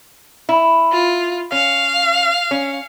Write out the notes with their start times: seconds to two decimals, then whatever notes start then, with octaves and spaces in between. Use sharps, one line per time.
0.49 E4
0.92 F4
1.52 C#4 F5
2.51 C#4